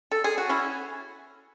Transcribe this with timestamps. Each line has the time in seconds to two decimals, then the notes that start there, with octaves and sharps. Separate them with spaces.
0.11 A4
0.24 G#4
0.38 F#4
0.49 C#4 E4